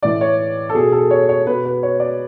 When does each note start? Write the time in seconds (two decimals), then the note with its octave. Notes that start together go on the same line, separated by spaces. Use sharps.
0.03 A2 E3 D5
0.21 C#5
0.69 A4
0.74 B2 G#4
0.92 A4
1.11 C#5
1.29 C#5
1.47 B2 B4
1.65 B4
1.83 C#5
2.00 D5